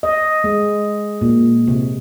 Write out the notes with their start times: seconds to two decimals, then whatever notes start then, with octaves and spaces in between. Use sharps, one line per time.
0.03 D#5
0.44 G#3
1.21 A#2
1.68 C3